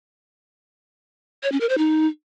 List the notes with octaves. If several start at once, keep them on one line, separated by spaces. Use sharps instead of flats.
C#5
C#4
A#4
C5
D#4